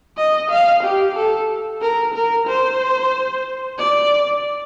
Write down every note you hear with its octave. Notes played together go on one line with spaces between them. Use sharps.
D#5
F5
G4
A4
A#4
A#4
C5
D5